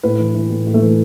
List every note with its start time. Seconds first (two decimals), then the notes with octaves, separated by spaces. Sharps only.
0.03 A2 B4
0.19 E3
0.34 E3
0.50 A2
0.67 A2
0.74 A3
0.82 E3